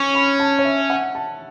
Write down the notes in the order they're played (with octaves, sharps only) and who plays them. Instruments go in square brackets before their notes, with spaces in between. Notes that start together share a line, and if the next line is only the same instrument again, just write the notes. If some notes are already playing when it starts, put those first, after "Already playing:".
Already playing: [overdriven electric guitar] C#4 [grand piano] C#6
[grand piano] B5
A5
C#5
E5
F#5
A5